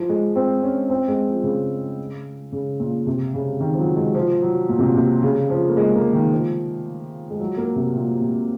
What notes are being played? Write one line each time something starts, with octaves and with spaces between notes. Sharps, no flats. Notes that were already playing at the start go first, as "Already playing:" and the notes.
Already playing: F3
G#3
C4
C#4
C4
G#3
F3
C#3
C#3
A#2
C3
C#3
D#3
F3
F#3
G#3
F3
F#3
A#2
C3
A#2
C3
C#3
F3
A#3
G#3
A#3
D#3
F3
G#3
F#3
A#3
C3
A#2
A#2